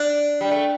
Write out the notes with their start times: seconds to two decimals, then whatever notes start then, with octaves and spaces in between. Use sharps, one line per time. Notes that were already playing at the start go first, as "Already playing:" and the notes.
Already playing: D4
0.41 G3
0.51 A3